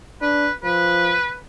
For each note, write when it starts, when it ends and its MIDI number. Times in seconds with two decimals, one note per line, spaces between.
0.21 0.47 62
0.21 0.51 71
0.64 1.16 53
0.64 1.36 71